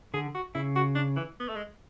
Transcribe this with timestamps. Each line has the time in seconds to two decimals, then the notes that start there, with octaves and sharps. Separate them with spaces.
0.14 D3 G#4
0.35 F#4
0.55 C#3 E4
0.76 F#4
0.95 D4
1.16 E3
1.40 B3
1.49 A3
1.56 G#3